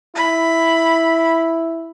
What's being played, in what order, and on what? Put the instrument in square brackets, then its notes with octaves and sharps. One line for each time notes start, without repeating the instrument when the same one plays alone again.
[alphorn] E4 [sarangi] B5